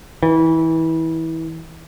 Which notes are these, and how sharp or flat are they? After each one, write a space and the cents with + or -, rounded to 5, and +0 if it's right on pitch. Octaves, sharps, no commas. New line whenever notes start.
E3 -25